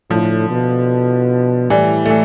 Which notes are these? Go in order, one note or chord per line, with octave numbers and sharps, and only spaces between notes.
A2 D3 F3
B2
A2 E3 G3
A3
E3